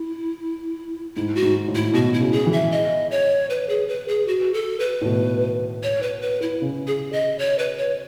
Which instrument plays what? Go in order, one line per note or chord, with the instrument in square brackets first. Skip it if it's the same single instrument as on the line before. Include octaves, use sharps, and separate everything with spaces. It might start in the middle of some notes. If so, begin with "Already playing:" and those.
Already playing: [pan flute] E4
[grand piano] G#2 [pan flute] E4
[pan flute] F#4
[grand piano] G#2
A2
[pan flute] E4
[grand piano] B2 [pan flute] F#4
[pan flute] E4
[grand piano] C#3
[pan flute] G#4
[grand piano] E3
[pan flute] E5
D#5
C#5
B4
G#4
B4
G#4
F#4
A4
B4
[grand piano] A2
B2
[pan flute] C#5
B4
B4
E4
[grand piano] C#3
[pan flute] G#4
D#5
C#5
B4
C#5